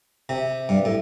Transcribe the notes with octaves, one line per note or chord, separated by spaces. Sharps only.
C3
G2
A2